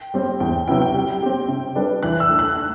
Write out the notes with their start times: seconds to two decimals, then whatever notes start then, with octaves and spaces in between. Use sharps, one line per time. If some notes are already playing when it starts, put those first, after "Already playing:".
Already playing: G5
0.14 G3 C4 G4 C5
0.40 E2 G5
0.68 C3 F#3 B3 E4 G5
0.82 G5
0.94 G3
1.22 C4 G4
1.48 C3
1.75 G3 D4 G4 B4
2.03 E3 F#6
2.20 E6
2.29 A3 D4
2.39 F#6